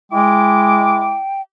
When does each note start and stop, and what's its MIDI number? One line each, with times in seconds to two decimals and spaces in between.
0.12 1.15 56
0.12 1.19 64
0.12 1.42 79
0.12 1.19 86